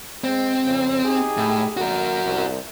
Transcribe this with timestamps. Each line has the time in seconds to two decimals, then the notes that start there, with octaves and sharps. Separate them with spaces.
0.24 G#3 C4
0.65 F2 C#3
1.04 D#4 G4 G#4
1.37 A2
1.77 D3 A#3 F#4 A#4
2.24 C2